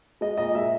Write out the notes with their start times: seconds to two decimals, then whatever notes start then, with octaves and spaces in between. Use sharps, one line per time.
0.21 G#3 D#5
0.38 A#2 D#5
0.55 G#3 E5